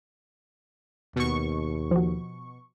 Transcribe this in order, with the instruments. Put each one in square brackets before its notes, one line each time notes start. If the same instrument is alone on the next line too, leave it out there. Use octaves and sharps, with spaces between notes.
[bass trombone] D#2 [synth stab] B2 C#6
[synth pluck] F3 F#4